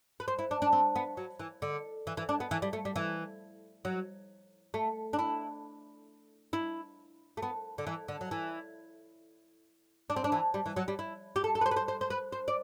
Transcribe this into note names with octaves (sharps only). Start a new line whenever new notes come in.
B4
C5
E4
D4
D4
C4
B3
F#3
E3
D3
E3
E3
D4
B3
E3
G3
A3
G3
E3
F#3
A3
D4
E4
E4
A3
B3
D3
E3
D3
F#3
E3
D4
C4
D4
E3
G3
E3
F#3
G3
E4
G4
A4
A4
B4
C5
B4
C5
C5
C5
B4
C5
D5